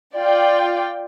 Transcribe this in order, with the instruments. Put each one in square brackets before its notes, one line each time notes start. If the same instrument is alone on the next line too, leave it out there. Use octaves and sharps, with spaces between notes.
[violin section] F4 D5 G5